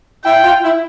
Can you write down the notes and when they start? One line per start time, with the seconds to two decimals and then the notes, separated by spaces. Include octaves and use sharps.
0.24 E4 G5
0.44 F4
0.63 E4